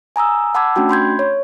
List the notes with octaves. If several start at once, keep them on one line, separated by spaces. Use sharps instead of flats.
G#5 A#5 D#6 E6
F#5 A5 B5 D6 E6 G#6
A3 C#4 D4 F#4 G5
B5 C6 G6 G#6
C#5